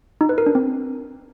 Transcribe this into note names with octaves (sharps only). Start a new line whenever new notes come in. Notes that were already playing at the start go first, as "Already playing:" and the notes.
D#4
B4
A#4
D4
C4